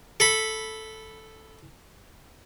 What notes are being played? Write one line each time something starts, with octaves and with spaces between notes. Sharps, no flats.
A4 B5